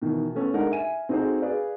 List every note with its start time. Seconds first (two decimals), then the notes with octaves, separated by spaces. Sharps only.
0.02 B2 D#3 E3
0.35 A3 B3 C#4 A4
0.54 G#3 D4 D#4 A4 A#4 F#5
0.71 E5 G#5 D#7
1.09 C4 D#4 F#4 G#4 A4 C5
1.42 G#4 B4 D5 F5